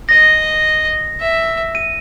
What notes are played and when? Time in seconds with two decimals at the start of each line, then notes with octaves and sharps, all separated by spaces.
0.09 D#5 A#6
1.20 E5
1.75 D#7